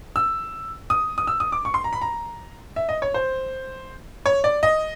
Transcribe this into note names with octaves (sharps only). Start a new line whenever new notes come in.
E6
D#6
D#6
E6
D#6
D6
C#6
C6
A#5
B5
A#5
E5
D#5
C#5
C5
C#5
D5
D#5